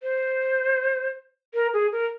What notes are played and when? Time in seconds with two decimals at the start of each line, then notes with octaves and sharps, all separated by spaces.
0.03 C5
1.54 A#4
1.74 G#4
1.92 A#4